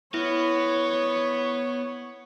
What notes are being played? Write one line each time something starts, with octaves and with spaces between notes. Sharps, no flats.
B3 E4 C#5